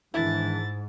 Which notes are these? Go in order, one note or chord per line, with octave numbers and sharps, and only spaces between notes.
G#2 D#3 E3 D4 E4 A6